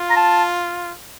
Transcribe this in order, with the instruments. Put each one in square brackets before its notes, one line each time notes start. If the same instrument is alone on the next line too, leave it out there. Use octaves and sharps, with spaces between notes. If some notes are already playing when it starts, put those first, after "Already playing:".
Already playing: [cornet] F4
[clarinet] A#5
A5